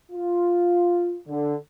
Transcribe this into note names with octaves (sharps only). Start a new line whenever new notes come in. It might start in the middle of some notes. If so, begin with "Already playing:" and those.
F4
D3